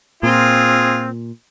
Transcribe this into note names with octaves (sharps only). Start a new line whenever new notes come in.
A#2 C4 F4 G#4